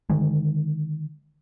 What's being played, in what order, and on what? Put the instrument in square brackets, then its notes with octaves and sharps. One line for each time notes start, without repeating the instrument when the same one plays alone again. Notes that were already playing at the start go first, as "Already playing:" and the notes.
[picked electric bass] D3 D#3 G#3